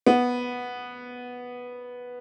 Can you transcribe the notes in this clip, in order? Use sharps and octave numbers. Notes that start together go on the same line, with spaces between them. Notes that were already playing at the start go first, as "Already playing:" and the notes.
B3